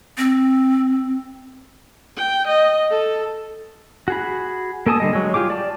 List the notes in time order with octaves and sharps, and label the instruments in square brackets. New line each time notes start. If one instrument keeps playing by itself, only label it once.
[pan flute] C4
[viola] G5
D#5
A4
[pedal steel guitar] F#4 G#4 B5
A#3 A4 G#5 A5 D#6
D3 G3 D#5
F#3 G#3
F4 G4 G#4 D6
D5 A5